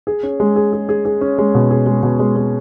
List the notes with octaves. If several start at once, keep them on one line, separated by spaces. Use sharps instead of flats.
G#4
C#4
G#3
G#4
G#4
G#4
G#4
C#4
G#3
B2
G#4
G#3
B2
G#3
G#3